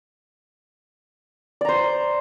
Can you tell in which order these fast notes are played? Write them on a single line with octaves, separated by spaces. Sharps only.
D5 A#5 C5